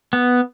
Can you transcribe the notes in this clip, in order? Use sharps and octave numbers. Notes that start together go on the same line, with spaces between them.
B3